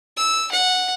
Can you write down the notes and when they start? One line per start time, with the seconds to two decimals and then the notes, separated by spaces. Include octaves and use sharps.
0.17 E6
0.52 F#5